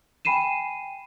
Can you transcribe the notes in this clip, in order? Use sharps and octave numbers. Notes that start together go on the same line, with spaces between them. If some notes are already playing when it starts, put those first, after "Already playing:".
G5 G#5 B5 C7 D#7 E7